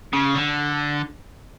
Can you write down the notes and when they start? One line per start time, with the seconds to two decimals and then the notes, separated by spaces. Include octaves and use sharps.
0.13 C#3
0.34 D3